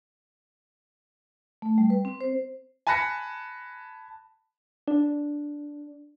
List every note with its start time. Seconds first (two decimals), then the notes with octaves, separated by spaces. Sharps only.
1.62 A3
1.78 G3
1.90 B4
2.05 C4
2.21 C5
2.87 G#5 A5 B5 F#6 A#6 C#7
4.88 D4